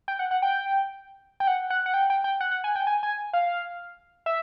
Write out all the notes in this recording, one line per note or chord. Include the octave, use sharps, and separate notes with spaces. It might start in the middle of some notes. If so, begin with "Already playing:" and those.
G5
F#5
F#5
G5
G5
F#5
F#5
F#5
G5
G5
G5
F#5
F#5
G#5
G5
G#5
G#5
F5
E5